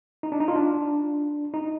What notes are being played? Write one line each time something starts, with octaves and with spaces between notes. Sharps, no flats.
D#4
D4
D#4
F4
D4
D#4